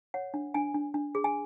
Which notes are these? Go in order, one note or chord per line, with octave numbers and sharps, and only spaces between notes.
C#5 F#5
D4
D4 G#5
D4
D4
G#4
G#5